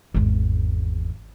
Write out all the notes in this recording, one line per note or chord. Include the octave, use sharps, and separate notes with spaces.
G#1 E2